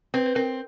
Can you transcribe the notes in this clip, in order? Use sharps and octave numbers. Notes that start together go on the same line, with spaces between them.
C4 B4
B4
C4 A#4